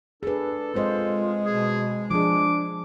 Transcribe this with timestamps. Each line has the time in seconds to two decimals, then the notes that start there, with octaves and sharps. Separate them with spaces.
0.23 D4 G#4 A4 B4
0.75 G#3 C4 F4 C5 D#5
1.45 B2 G#4
2.11 F3 D4 G#4 D6